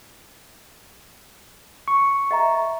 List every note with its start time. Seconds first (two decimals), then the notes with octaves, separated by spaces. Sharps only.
1.88 C#6
2.31 D#5 E5 A#5